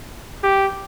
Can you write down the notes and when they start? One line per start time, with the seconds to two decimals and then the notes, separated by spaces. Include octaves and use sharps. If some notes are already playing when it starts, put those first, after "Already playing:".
0.43 G4